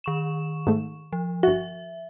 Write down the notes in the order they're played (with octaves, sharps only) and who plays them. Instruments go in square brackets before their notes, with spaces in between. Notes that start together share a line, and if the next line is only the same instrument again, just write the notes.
[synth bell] D#3 C#6 E7
[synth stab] G#2 A3
[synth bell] F3
[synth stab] G1 F#4 [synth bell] E5